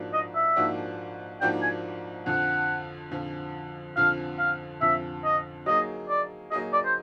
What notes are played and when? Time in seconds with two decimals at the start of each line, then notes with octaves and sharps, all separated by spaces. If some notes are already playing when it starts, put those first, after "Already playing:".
Already playing: G#2 F3 A#3 D4 F#4
0.14 D#5
0.35 E5
0.56 G#2 F3 A#3 D4 F#4
1.41 G#2 F3 A#3 D4 F#4 G5
1.62 G#5
2.26 F2 D3 F3 F#5
3.11 F2 D3 F3
3.97 F2 D3 F3 F5
4.39 F5
4.81 F2 D3 F3 E5
5.24 D#5
5.66 F#3 A#3 D#4 G#4 D#5
6.09 D5
6.51 F#3 A#3 D#4 G#4 D#5
6.73 D5
6.85 C5